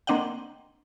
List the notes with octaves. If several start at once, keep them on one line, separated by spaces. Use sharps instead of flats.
A#3 C4 D4 D#5 F#5 G5